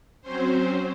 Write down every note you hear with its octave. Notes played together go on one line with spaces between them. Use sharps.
F#3 C4 C#4 C5